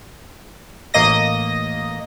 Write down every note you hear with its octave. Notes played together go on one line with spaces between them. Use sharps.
A1 A#3 D#5 A#6